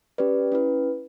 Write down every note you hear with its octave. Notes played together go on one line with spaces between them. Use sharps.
C#4 G4 B4 D5
C#4 E4 B4